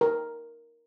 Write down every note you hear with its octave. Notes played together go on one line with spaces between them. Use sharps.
A#4